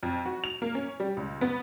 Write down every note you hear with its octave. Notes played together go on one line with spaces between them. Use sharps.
F2
F#4
F7
A#3
C#4
G3
C#2
B3